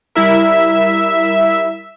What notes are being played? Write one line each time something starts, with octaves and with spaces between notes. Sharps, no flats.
G3 E4 A#4 E5